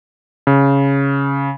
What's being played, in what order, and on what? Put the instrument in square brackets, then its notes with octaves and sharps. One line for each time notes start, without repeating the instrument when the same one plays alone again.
[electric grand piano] C#3